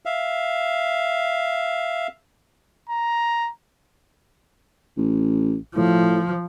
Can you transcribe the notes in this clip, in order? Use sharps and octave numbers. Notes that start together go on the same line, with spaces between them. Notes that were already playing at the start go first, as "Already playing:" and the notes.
E5 F5
A#5
A1
A2 F3